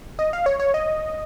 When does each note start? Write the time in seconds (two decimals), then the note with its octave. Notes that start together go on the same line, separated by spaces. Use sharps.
0.19 D#5
0.33 F5
0.46 C#5
0.60 C#5
0.74 D#5